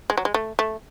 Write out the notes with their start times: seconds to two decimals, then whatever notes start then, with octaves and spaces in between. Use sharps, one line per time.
0.10 G#3
0.18 F#3
0.25 G#3
0.34 A3
0.59 A3